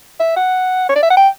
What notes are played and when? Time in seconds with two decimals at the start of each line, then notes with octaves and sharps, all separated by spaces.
0.20 E5
0.36 F#5
0.89 C#5
0.95 D5
1.02 E5
1.10 F#5
1.17 G5